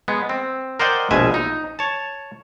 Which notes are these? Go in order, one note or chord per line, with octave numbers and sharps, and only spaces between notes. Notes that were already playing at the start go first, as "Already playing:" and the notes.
G#3 B3
C4
A#4 C5 D5 D#5 F#5 G5
A#1 B2 G#3 E5 G#5
D#4
C#5 A5